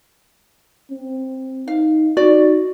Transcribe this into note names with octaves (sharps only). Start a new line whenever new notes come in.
C4
D#4 F5
D#4 F#4 D5